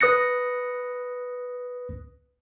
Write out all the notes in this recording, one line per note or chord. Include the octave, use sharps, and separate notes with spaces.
B4 D#6 F#6 A#6 C#7